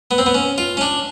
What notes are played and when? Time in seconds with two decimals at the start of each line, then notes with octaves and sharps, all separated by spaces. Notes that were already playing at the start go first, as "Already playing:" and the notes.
0.11 B3
0.18 C4
0.26 B3
0.35 C#4
0.58 F4
0.77 C#4
0.81 D4